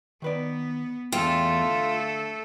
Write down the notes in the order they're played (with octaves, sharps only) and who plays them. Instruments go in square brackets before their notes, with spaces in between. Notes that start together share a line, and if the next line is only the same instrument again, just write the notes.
[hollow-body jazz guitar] D#3 B4 D5 [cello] B3
[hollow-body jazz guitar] E2 F3 G5 [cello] A3 A4 [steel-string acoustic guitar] F4
[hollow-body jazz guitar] D3